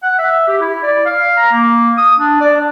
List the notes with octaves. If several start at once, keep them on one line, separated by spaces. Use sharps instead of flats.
F#5
E5
G4
E4
D5
F5
A#5
A#3
D#6
D4
D5
D4